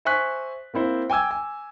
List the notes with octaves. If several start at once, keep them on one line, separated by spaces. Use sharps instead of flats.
C5 E5 G#5 C#6 F#6 B6
A#3 C4 E4 C5
G5 G#5 D6 E6 G#6
G#5